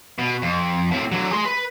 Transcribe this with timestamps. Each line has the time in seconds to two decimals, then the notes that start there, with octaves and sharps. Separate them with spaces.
0.18 B2
0.42 F2
0.91 A2 C4
1.12 D3 F#3
1.31 G#4 C6
1.45 B4